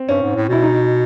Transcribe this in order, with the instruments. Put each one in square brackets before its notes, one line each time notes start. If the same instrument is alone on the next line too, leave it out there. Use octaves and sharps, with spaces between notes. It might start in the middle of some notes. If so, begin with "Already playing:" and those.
Already playing: [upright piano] C4
[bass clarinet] G2 [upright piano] C#4
[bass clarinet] G#2
A2
[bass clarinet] B2 [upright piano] E4
[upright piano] D#4